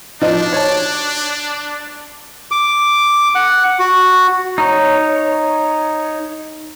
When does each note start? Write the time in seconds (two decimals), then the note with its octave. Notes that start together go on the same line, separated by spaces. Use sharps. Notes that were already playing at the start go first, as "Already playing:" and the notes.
0.22 F3 D4 D#4
0.53 C#5 A5
2.51 D6
3.35 F#5
3.79 F#4
4.58 D#4 C#5